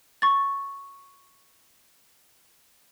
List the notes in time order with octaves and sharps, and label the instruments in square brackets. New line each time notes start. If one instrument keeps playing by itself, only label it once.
[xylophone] C#6 A6